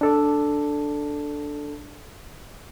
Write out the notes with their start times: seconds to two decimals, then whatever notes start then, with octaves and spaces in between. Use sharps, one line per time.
0.01 D4 A4 D5